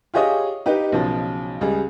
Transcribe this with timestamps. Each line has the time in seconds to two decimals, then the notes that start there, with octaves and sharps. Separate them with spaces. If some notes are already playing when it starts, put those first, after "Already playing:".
0.14 F4 G4 G#4 C#5 D#5 D#6
0.66 D#4 G4 B4
0.92 B1 C#3 F3 F#3
1.61 C#2 G3 G#4